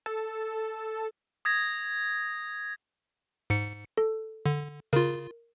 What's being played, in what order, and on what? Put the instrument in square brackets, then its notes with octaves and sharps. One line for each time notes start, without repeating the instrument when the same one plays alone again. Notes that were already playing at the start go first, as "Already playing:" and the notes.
[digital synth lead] A4
[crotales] D#6 G#6 A#6
[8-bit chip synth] G#2 C#7
[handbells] A4
[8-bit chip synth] D3
[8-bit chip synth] C#3 F4 [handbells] A#4